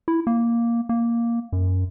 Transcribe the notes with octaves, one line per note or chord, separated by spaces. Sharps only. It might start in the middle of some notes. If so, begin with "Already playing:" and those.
E4
A#3
A#3
F#2